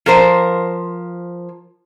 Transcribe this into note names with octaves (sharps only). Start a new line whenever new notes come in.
F3 A#4 C5